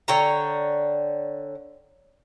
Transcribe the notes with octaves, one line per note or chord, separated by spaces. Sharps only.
D3 C#5 G5 A#5